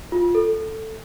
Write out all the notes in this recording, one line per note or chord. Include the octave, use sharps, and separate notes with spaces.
F4
A4